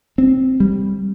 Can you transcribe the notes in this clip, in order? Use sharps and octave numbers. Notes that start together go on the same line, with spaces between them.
C4
G3